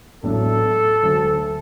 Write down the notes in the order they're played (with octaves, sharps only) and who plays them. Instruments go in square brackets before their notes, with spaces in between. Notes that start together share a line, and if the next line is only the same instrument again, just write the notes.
[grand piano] A1 A2 F#3 B3 D4 [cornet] A4
[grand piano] D2 D3 F#3